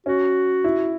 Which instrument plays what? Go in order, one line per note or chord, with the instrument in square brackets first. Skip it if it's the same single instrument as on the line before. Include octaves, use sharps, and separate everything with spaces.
[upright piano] C#4 [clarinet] F#4
[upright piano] E4